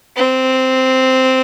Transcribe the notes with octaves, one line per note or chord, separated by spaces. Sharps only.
C4